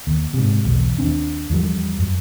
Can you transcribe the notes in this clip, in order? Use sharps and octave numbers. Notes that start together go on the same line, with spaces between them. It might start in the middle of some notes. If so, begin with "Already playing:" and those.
D#2
G#2 C3
B1 E2
D#2 C4 D4
E2 F3 G3
F#2